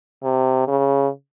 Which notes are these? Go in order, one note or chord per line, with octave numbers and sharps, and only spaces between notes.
C3
C#3